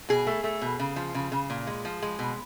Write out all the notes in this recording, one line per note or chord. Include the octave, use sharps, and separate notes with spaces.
B2 G#4
A3
A3
B2
C#3
F3
C#3
C#3
A#2
G#3
F3
G#3
B2